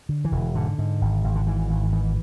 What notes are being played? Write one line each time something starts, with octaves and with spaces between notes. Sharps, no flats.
D3
E3
E1
G#2 D3
G#2
G#1
G#1
D3
G#2 E3
G#1
G#2 E3